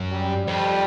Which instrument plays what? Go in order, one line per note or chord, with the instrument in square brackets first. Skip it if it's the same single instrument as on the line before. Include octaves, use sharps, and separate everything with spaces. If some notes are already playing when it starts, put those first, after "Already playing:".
Already playing: [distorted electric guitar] F#2
[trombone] G3
[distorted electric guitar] F2 [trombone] G3